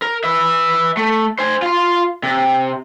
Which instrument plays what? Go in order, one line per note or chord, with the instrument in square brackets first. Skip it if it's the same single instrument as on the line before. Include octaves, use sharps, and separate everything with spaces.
[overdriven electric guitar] A#4
B4 E5
A3
C5 G#5
F4 C6
C3